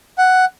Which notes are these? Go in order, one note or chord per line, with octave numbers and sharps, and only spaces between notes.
F#5